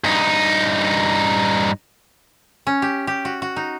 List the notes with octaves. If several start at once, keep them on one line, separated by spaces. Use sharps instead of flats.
G2 D#4
C#4
G4
G4
F#4
F#4
D#4